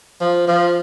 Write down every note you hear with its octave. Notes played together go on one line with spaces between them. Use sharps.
F3
F3